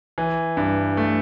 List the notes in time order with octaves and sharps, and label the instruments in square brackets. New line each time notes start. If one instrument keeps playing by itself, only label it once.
[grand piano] E3
G2
A3